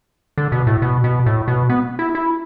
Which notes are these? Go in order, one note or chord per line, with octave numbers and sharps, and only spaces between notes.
D3
B2
A2
B2
B2
A2
B2
B3
E4
E4